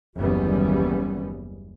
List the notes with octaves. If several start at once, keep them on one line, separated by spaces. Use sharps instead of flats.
F#1 D#2 E3 G3 B3 C#4